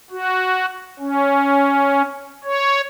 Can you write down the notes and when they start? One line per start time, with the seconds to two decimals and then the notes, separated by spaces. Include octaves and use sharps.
0.11 F#4
1.00 C#4
2.44 C#5